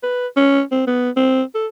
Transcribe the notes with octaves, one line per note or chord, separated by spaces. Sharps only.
B4
C#4
C4
B3
C4
A4